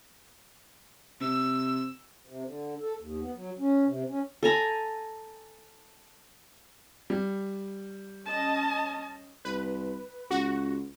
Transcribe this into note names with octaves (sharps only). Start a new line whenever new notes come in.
C3 E6
C3
D3
A4
D#2
B3
F#3
C#4
C3
C#4
A4 G#5 A#5 B5
G3
C#4 D#5 A5
C2 B4
C#2 F#4